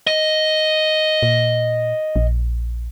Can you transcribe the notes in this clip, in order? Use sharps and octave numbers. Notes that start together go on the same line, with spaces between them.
D#5
A#2
A#1